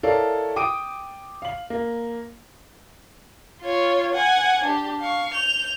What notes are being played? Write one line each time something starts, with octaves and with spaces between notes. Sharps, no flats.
E4 A4 A#4 C#5 D5 F5
G5 D6 D#6 D7 D#7
F5 F#7
A#3
F4 C#5
F#5 G#5
D4 G4
F5 C#6
G6 F7